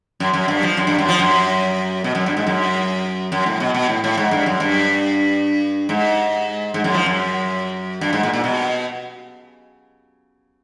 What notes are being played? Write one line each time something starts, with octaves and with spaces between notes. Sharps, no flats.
F#2
F#2
G2
F3
F#2
G2
F#2
F3
F#2
B2
F#2
G2
G#2
F#2
F#2
A2
B2
B2
A2
A2
G#2
G2
F#2
G2
G#2
G#2
F#2
F3
F#2
G2
G#2
A#2
A#2
B2